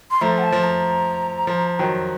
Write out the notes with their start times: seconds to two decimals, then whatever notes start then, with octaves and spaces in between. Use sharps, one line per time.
0.11 C6
0.21 F3 A3 A#5
0.38 F#5
0.43 A5
0.52 F3
0.64 A#5
1.47 F3
1.79 D#3 F#3